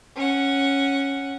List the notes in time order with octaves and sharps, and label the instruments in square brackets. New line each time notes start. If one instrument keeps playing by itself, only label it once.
[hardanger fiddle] C#4 F#5